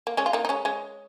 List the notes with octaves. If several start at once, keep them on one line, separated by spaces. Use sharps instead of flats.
A#3
G#3 C#4
F4
A#3 D#4
D#4
G#3 C#4
G#3 C#4